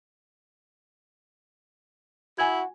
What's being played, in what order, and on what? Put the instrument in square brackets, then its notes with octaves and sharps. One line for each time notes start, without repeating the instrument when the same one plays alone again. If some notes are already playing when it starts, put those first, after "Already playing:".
[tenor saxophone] E4 [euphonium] F#4 [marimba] G#5 G#6